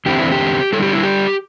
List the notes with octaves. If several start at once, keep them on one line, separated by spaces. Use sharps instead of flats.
E2 D3 C4 E4 G4
E4
G4
D3 G3 E4 A4
G4
E4
G4